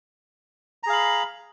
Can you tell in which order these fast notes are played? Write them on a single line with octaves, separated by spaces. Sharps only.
A#5 G#4 F5 B5